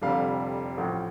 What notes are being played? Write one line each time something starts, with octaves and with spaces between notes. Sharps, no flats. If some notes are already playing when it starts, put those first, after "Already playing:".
F1 F2 D3 G3 F5
A1 A2 F3